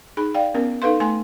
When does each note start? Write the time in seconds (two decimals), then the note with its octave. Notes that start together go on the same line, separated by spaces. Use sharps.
0.17 D#4 G#4 B5
0.34 D5 F5 G5
0.55 B3 C#4 A#4
0.82 D#4 A4 B4 F5 C6
1.00 A3 G#5 C6